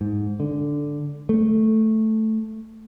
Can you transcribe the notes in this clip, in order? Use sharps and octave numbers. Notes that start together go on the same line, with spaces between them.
G#2
D3
A3